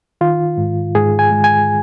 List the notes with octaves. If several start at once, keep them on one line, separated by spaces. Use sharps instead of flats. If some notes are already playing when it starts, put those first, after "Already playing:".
D#3 F4
G#2
G#2 G#4
G#5
G#3
G#5